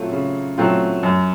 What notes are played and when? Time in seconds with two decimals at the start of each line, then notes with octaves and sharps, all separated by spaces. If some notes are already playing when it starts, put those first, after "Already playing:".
Already playing: F#3 A3 C4 F4
0.12 C#3
0.58 F#3 A3 C4 F4
1.03 F#2